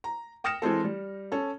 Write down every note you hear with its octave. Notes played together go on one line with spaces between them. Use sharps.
A#5
G5 D#6 F6 A#6 C#7 E7
E3 G#3 C4 A4
G3
C#4 A4